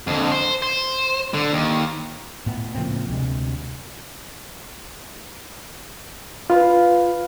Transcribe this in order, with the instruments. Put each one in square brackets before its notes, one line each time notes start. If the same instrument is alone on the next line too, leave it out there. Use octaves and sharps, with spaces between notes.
[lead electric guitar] F2 D3
C5
C5
D3
D#2
[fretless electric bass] A2 B3
C#3 F3 A#3 C4
D2 C3 G#3
[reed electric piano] F4 [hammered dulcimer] B4 F5